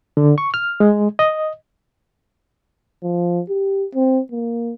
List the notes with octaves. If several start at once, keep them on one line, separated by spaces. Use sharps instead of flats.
D3
C#6
F6
G#3
D#5
F3
G4
C4
A#3